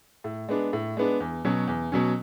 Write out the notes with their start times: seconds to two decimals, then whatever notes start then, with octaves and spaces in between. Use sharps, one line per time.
0.24 A2
0.49 G#3 B3 D4
0.73 A2
0.97 G#3 B3 D4
1.20 E2
1.45 B2 F#3 C#4
1.68 E2
1.92 B2 F#3 C#4